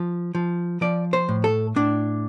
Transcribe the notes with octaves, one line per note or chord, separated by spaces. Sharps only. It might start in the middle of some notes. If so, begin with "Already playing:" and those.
Already playing: F3
F3
F3 D5
C5
A2
A4
A2 D4